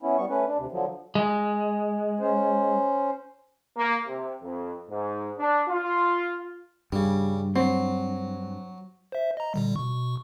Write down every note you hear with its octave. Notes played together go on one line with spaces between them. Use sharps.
B3 C#4 E4
G3 B3 C#6
A3 C#4 B4
D4
D2 C3
D3 F3 F#3
G#3
C#4 C5
A#3
C3
F2
G#2
D4
F4
G2 C#3 G3
F#3 C4
C5 E5
D#5 A#5
A#2 D3 G3
B2 C#6